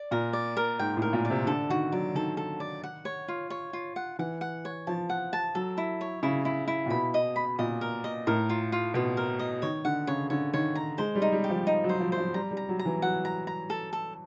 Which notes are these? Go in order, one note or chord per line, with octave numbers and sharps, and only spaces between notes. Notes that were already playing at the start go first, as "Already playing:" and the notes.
Already playing: D5
A#2 A#4
D5
A#4
G#2 G5
A2
A#4
A#2
D5
C3
D3 A4
D#3 F#4
F#3 D5
D#3 A4
A4
D5
F#5
C#5
F4
C#5
F4
F#5
E3 F#5
F#5
C#5
F3 A5
F#5
A5
F#3 A4
E4
C#5
C#3 E4
E4
E4
A#2
B2 B5
D#5
B5
A#2 D#5
A#4
D#5
A2 A#4
F4
F4
B2 F4
A#4
D#5
D#3 C#5
D3 F#5
C#3 C#5
D3 C#5
D#3 C#5
A#5
G#3 C5
G3
D#4
G3
G4
F3
D#4
F#3
C5
F3
C5
F3
G3 A#5
G3
A#5
F#3
A#5
E3
F#3 F#5
A#5
A#5
A4
A4